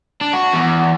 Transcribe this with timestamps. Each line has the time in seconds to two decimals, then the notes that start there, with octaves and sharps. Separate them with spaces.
0.21 D4
0.33 F#4
0.54 E2